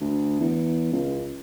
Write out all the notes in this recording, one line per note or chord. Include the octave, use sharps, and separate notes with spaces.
D2
E2
C#2